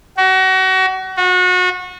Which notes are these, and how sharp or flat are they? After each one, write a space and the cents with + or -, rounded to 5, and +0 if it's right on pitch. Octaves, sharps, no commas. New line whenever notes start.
F#4 +30
F#4 -30